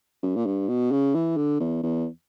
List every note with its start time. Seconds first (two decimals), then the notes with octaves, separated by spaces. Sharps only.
0.23 F#2
0.36 A#2
0.46 G2
0.68 B2
0.92 C#3
1.14 E3
1.37 D3
1.60 E2
1.83 E2